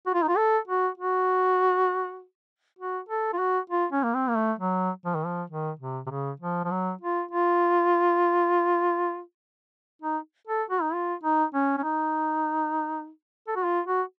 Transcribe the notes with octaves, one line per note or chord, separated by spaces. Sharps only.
F#4
F4
D#4
F4
A4
F#4
F#4
F#4
A4
F4
F#4
F4
C#4
A#3
C4
A#3
A3
F#3
F3
D#3
F3
D#3
C3
C3
C#3
F3
F3
F#3
F4
F4
D#4
A4
F#4
D#4
F4
D#4
C#4
C#4
D#4
A4
F#4
F4
F#4